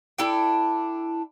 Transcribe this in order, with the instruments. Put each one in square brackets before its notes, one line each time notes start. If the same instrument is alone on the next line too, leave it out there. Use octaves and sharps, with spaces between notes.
[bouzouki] D4 E4 A4 G5